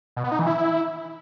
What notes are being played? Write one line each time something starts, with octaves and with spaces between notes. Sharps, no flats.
B2
B3
D#4
E3
E4